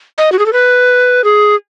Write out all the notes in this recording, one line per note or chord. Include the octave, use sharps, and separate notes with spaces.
D#5
F#4
G#4
A4
B4
G#4